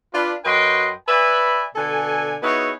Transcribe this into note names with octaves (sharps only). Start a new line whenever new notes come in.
D4 F4 B4
F#2 F#4 B4 D#5 G5 C6
B4 D5 E5 F#5 G#5 B5
B2 D3 A4 G#5
B3 D#4 E4 F#4 G#4 C#5